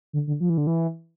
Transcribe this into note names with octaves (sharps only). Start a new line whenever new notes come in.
D3
D3
F3
E3
D3
E3